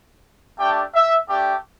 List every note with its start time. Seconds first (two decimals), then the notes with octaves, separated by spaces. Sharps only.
0.58 A3 D4 G4 G5
0.94 E5
1.29 A3 D4 G4